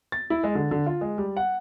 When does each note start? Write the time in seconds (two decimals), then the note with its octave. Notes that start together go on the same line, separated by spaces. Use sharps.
0.12 A6
0.30 E4
0.43 G#3
0.55 D3
0.71 D3
0.86 F4
1.01 G#3
1.18 G3
1.37 F#5